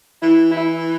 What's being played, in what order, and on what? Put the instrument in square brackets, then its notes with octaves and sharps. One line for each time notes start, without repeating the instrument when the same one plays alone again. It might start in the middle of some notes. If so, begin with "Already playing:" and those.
[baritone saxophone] E3 [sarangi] E4
[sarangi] E4